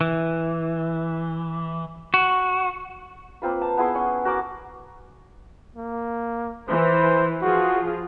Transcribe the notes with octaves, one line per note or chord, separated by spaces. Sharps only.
E3
F#4
A#3 C4 F4 B4
A5
B3 E4 G#4 C6
C#4 F#5
F#4 A#4 D6
A#3
E3 C5
F3 F4 F#4 G#4